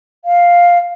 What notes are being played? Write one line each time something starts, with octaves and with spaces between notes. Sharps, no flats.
F5